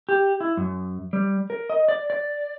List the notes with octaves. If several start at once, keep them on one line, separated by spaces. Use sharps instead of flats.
G4
E4
F#2
G3
A#4
D#5
D5
D5